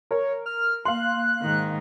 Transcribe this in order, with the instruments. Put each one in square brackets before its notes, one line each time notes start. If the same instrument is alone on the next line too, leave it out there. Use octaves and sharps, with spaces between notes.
[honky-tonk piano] A#4 [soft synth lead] C#5
[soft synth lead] F6
[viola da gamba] A#3 [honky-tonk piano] F5 C6 [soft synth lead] F#6
[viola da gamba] G#2 D#3